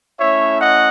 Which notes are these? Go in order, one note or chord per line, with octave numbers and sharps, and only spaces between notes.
A3 C#4 E4 C#5 E5
D#5 F#5